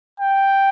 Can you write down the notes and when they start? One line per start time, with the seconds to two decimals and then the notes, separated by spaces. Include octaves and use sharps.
0.20 G5